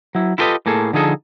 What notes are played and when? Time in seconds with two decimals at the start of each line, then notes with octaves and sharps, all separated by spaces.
0.15 F#3 E4
0.38 E4 F4 G4 A4 B4 D#5
0.66 A2 A#3 G#4 A4
0.93 D3 F3 D#4 G#4 A4